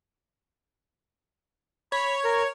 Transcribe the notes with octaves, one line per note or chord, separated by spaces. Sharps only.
C#5 B5
A#4